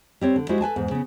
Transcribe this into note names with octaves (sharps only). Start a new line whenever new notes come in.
G3 C4 C#5
D3
G3 G#3 E4 F#4 C5
A4 B4 G#5 A5
E2 G#2
C#3 B3